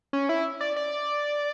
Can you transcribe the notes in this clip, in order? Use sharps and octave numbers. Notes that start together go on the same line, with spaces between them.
C#4
E4
D5
D5